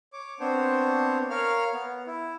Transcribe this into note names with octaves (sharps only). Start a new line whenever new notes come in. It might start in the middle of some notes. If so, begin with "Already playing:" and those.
C#5 D6
B3 C4 D4 C5 C#5
A#4 C#5 F5 F6
B3
E4